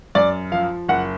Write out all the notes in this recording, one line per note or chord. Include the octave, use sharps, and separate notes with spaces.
F#2 D5
F3 F5
F#1 F#5